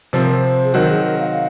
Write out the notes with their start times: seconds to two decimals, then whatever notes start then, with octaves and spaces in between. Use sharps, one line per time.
0.13 C3 F3 C4 A#4
0.62 G#4
0.74 D#3 F#3 C4 F#4 A#4
0.89 G#4
1.04 A#4
1.19 F5